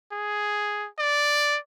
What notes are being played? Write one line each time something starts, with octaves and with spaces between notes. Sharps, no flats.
G#4
D5